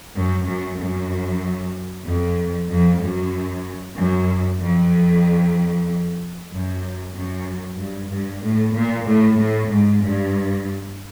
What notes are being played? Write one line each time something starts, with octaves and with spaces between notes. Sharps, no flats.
F#2
F#2
F#2
F2
F2
F#2
F#2
F2
F#2
F#2
G2
G2
A2
A#2
A2
A2
G#2
G2